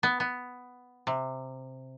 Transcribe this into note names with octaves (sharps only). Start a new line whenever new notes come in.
B3
B3
C3